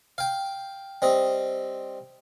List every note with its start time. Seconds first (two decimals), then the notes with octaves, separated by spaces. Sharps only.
0.18 F5 G5
1.02 G3 C4 D#5